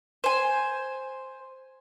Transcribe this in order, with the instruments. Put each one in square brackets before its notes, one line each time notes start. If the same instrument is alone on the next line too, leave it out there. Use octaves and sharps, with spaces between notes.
[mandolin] C5 G#5